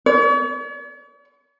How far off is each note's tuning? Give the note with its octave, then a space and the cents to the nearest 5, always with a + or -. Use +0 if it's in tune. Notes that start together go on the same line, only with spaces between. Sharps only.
C#5 +45